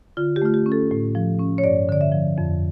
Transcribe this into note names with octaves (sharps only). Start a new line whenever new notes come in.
D3 F4
G4
A3 F4
G4
C#4
A4
A2
F3
C#4
C#5
G2 D5
D3 D5
E5
F3
F2